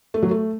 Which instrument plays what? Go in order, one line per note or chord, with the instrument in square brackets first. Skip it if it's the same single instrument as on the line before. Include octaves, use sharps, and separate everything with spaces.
[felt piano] A3
F#3
A3